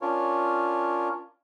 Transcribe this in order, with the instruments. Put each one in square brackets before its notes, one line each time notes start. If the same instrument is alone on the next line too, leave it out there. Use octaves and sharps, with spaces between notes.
[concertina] C#4 D4 F4 A#4 C#5